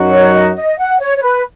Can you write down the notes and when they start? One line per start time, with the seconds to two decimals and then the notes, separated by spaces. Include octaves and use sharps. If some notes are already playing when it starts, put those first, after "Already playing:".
Already playing: F#2 F#3 D#4 F#4
0.11 C#5
0.33 D#5
0.55 D#5
0.78 F#5
1.00 C#5
1.17 C#5
1.22 B4